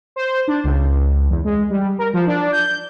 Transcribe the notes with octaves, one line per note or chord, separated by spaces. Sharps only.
C5
D4
C#2
E2
G#3
G3
A#4
F3
D4
G6